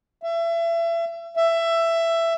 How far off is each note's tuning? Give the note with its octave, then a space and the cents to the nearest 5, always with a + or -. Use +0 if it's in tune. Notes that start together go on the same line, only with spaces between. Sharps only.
E5 +30
E5 +15